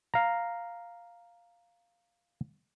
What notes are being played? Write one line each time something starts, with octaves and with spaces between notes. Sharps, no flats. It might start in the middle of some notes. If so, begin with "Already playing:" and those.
F5 A#5